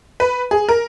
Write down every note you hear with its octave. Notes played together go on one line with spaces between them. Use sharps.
B4
G#4
A#4